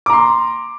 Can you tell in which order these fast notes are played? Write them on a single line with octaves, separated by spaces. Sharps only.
D6 A#5 C6